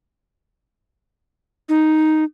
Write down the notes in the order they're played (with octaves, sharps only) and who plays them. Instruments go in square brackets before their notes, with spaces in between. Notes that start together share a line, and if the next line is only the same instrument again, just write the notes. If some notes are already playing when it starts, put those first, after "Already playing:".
[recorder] D#4